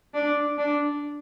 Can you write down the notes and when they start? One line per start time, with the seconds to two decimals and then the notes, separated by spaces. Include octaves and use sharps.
0.14 D4
0.58 D4